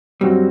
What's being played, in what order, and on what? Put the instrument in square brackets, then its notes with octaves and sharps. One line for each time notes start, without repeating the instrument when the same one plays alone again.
[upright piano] G2 F#3 C4 F#4 [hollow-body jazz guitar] G3